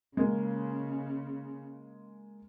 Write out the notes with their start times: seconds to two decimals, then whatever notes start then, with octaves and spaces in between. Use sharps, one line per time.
0.17 C#3 G#3 A#3